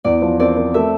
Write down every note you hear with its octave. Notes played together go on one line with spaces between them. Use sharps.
E2 D5
F3
C4 D5
C4
A3 E5